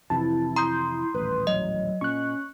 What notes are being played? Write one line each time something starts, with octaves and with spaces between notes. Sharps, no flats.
F2 C3 E3 E4 A5
A#5 C6 D#6 G6
D#1 A1 B4
F#3 D#5
A#2 C#4 C#6 F#6